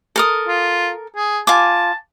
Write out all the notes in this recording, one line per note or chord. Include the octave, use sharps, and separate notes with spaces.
A4 A#4 D#6
F4
G#4
F4 G#5 A5 D6